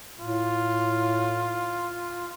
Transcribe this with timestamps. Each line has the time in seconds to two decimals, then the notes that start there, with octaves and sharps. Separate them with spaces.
0.20 A2 F4